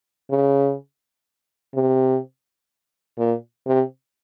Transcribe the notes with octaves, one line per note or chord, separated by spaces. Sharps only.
C#3
C3
A#2
C3